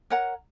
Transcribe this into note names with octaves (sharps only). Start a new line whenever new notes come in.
A#4 C#5 F#5 A#5